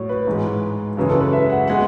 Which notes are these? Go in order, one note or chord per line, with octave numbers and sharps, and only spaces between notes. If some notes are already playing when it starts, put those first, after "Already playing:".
Already playing: A2 F#3 C#5
B4
G#2 E3 G#3
F#2 C#3 E3 G#3 B4
A4
B4
E5
F#5
G#3 F#5